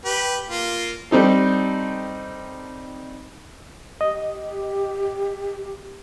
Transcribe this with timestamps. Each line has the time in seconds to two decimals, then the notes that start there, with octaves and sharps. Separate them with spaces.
0.05 G4 B4
0.49 A#3 F4
1.11 G3 C4 D#4 A4
4.01 G4 D#5